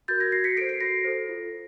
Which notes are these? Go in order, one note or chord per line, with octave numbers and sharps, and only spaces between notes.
F#4 A#4 G6 A6
G#6 A#6
F#4 A#6 C7
B6 C#7
A4 C5 C7 D7
C7 D7
F#4 A#6 C7
A4 C5
F4